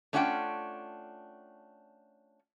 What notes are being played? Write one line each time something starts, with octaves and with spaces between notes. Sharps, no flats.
A3 C#4 D4 F4 F#5 G5